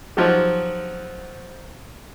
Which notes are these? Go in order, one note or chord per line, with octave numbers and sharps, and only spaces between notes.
F3 F#3 D#4 G4